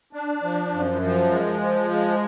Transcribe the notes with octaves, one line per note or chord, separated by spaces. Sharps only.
D4
F3
F#2
F3
G#3
F3
G#3